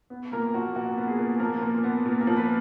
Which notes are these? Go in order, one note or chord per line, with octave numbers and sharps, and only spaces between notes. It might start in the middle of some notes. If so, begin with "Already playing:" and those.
B3
A#2 A#3 A#4
F3 F#4
A#2 F#4
B3
G#4
A#2
F3 A#3 A#4
A#2
B3
A#2
A#4 A#5
F3
B4 B5